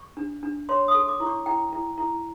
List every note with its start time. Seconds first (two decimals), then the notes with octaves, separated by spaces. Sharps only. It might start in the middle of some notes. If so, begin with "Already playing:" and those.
Already playing: C#6
0.17 D4
0.43 D4
0.69 C#5 C6
0.88 D#6
0.95 A4
1.08 D6
1.20 E4
1.27 C#6
1.46 E4 G5
1.72 E4
1.98 E4